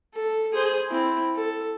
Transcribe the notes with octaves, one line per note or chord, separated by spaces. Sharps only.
A4
G#4 C5
C4 E4
A4